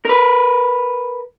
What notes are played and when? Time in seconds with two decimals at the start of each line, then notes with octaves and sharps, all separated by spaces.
0.05 A#4 B4